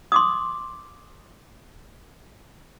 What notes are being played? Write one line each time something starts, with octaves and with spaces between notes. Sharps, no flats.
C6 D6 D#6